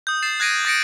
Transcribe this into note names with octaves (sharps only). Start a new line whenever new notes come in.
D#6 G6
A6 C7 E7
F#6 G#6 A#6 D7 D#7
D#6 A6 A#6 C#7 D7